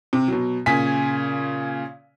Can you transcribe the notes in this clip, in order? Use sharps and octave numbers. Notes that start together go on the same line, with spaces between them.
C3
B2 F#3
A#2 C#3 G#5 B6